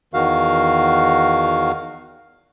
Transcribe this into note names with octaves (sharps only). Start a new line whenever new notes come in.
E2 D#3 F#4 F5